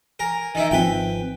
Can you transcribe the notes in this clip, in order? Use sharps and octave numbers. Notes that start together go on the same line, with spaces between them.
A#4 G#5
D#3 D#4 E4
G#1 F3 C4 B4 G5